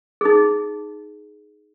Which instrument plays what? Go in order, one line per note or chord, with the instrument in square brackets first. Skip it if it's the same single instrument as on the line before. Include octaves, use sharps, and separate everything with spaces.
[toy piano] D#4 G#4